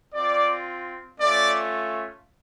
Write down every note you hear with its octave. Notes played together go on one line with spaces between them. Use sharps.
C4 F4 D5
A3 C#4 F4 D5